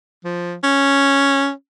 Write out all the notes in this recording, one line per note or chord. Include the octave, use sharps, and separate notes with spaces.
F3
C#4